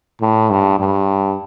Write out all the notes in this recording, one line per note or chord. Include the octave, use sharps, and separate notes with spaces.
A2
G2
G2